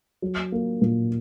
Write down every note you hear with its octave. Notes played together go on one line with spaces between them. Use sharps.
F#3
A#3
A#2